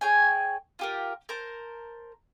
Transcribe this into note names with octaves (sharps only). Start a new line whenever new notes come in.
G#4 C#5 G5 G#5
F4 G4 A#4
A#4 C5 A5